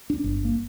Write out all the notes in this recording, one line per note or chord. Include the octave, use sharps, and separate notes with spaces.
D4
G1
A#3